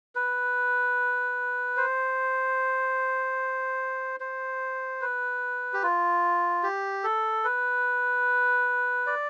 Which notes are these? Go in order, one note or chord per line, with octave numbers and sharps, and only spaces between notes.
B4
C5
C5
B4
G4
F4
G4
A4
B4
D5